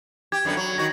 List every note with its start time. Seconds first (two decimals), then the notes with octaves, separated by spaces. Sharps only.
0.32 G4 G#6
0.45 F#2 D3 B3 G#6
0.57 F#3
0.78 D#3 F#4 A#6